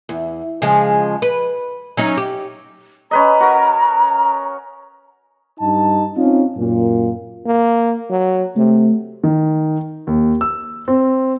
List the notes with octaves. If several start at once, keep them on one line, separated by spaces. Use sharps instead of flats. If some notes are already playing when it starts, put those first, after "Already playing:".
E2
C#3 F3 G#3
B4
F#3 C#4 D#4
G4
C#4 B4 D#5 A#5
F#4 A#4
G2 D#4 A5
C4 C#4 D#4 F4
F#2 A#2
A#3
F#3
C3 A3
D#3
D#2
E6
C4